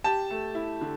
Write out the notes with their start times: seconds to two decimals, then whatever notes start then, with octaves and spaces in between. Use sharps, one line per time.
0.04 G4 A5
0.30 A3
0.55 E4
0.81 D3